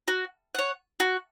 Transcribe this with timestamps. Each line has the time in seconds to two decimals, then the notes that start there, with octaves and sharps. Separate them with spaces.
0.08 F#4
0.55 C#5 F#5
1.00 F#4